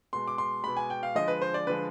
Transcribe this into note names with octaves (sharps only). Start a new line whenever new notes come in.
B2 G#3 C6
D6
C6
B2 G#3 B5
G#5
G5
F5
D3 F3 G#3 D#5
B4
C5
D5
D3 F3 G#3 B4